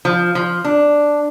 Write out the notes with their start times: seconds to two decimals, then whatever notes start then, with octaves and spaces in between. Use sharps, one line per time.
0.05 F3
0.35 F3
0.64 D4